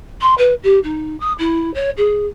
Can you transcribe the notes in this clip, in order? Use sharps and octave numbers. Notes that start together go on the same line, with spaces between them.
C6
B4
G4
D#4
D#6
E4
C#5
G#4